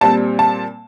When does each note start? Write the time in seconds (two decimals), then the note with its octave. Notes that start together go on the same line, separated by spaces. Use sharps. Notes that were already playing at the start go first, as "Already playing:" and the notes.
0.01 A#2 G3 C4 A5
0.39 A5